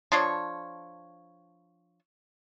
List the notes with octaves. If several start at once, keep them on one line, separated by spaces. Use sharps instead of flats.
F3 D4 A4 C#5